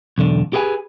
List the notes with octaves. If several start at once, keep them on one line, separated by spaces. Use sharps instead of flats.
B1 E2 D3
G4 G#4 B4 F#5 G#5